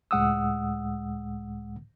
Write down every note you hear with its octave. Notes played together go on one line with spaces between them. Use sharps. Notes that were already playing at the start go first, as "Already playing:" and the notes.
C#2 A2 G#3 F#5 D#6 E6